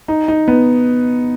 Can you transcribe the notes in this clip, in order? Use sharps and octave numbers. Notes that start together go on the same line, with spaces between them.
D#4
D#4
B3